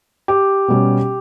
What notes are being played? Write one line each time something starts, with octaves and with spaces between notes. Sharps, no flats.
G4
B2 G3 C#4